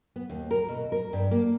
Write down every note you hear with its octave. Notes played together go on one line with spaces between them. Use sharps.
B3
D#2
A#4
B2
A#4
G2
A#3